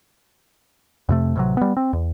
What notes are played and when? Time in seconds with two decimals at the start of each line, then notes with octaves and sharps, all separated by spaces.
1.09 F2 C3 A3
1.36 A1 C3 F#3
1.57 G3 B3
1.77 C4
1.93 E2